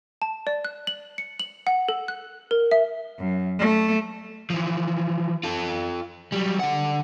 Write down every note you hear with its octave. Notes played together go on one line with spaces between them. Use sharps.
A5
D5
F#6
F#7
C#7
F#7
F#5
A4
F#6
A#4
E5
F#2
A3
E3 F3
F4 A4
F#3 G3
D3 F#5